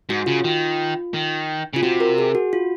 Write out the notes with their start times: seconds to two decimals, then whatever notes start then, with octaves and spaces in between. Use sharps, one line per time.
0.09 G#2 F#4
0.26 C#3 F4
0.44 D#3
1.14 D#3
1.73 C#3 F4
1.83 C3 F#4
2.00 A#4
2.18 G#4
2.35 F#4
2.53 F4